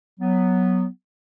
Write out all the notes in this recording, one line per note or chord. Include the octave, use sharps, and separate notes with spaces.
F#3 B3